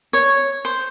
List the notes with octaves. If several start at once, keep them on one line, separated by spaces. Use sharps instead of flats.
C#5
C5